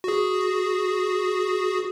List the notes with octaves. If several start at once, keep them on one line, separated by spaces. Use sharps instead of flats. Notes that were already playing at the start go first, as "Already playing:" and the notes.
F#4 G#4